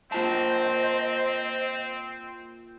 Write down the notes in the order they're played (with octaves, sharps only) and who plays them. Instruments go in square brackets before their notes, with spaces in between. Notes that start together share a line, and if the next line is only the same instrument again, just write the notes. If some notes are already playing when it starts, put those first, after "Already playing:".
[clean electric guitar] A#3 F4 A5 [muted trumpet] C4 [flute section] C5 D#5